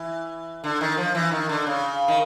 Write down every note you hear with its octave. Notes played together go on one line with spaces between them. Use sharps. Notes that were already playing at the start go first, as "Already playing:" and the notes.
Already playing: E3
D3
D#3
F3
E3
D#3
D3
C#3
D#3